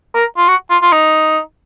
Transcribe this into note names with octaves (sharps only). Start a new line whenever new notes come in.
A#4
F4
F#4
F4
F4
D#4